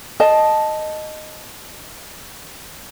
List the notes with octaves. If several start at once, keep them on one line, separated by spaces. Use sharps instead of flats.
D#5 A5